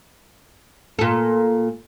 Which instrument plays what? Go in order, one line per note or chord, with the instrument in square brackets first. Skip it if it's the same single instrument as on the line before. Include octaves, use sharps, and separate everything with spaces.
[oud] A#2 A4